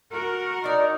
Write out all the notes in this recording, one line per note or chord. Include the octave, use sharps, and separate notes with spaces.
F#4 A#4
D4 D#4 D5